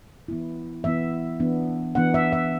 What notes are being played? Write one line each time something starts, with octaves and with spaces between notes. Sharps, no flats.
E3 B3 E4
E3 B3 E4 E5
E3 B3 D4
E3 B3 D4 F#5
E5
E5